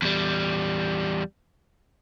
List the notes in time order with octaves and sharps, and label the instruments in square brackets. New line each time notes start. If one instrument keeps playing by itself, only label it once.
[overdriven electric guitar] E2 G3